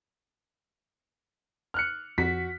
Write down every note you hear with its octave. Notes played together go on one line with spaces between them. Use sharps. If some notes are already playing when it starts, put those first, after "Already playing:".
F6 F#6 C#7
F2 F#4 B6